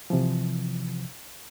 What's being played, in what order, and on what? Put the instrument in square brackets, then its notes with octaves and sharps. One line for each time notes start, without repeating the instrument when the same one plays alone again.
[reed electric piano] C3 E3 F3